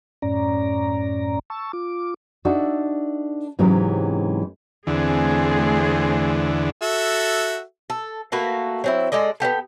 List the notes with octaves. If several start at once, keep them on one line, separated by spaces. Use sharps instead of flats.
F#2 A2 C#4 D5 A#5
A5 C#6 E6
F4 D6
D4 D#4 F#4 A4 E5
G#2 C3 E3 F#3 G#3 C#4
E2 D3 A3 C4 G#4
F#4 A4 E5
A4
A3 A#3 F#4 B4
F#3 C4 E4
G#3 A4 D5 D#5
B3 C4 G4 A4